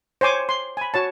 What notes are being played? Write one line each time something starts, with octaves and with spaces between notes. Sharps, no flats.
C5 C#5 G#5 D6
C6
G#5 B5
F#4 C#5 A5